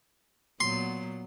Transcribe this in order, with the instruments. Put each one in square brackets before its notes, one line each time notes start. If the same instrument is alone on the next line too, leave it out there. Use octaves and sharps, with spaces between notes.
[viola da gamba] A#2 F#3 B3 [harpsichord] C6